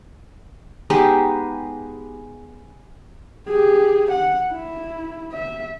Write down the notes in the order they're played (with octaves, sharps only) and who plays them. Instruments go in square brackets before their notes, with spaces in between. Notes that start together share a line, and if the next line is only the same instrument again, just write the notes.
[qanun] G#3 B3 D#4 G4
[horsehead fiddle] G4 G#4
F#5
E4
E5